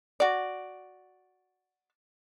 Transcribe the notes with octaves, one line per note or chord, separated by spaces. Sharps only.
F#4 D5